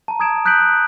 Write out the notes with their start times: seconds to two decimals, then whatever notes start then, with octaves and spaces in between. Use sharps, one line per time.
0.08 A5 A#5
0.20 A#5 D#6 G#6 D7 E7
0.45 D#6 F#6 G6 B6 D7 F#7